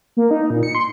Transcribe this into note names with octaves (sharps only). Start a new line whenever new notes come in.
A#3
D#4
A#2
C#7
C6